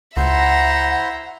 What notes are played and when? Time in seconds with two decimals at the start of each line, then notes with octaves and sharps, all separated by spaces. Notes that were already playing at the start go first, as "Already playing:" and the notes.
0.17 C#2 E4 C5 E5 F#5 A#5 C6